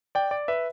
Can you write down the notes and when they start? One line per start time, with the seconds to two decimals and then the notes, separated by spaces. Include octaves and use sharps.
0.15 D5 G5
0.31 D5
0.48 B4 E5